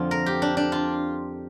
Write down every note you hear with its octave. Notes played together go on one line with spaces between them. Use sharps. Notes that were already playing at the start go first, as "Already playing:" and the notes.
Already playing: F2 D3 F3 C4 F4
A#4
G4
D4
D4
F4